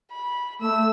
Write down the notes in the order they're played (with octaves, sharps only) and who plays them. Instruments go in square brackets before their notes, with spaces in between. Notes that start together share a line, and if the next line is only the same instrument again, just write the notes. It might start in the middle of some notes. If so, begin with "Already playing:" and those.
[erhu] B5
[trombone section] A3 [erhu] E6